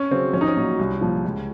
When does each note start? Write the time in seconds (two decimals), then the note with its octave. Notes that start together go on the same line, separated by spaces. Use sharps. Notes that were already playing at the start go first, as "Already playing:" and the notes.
Already playing: C#4
0.11 C#3 F#3 C4
0.33 A#1 C#4
0.41 D#4
0.47 C#4
0.56 A#2 F#3
0.79 C2
1.01 A#2 F3
1.25 C#2